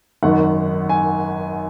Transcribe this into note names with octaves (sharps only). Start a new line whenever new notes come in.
G#1 F#2 D#3 F#5
G#5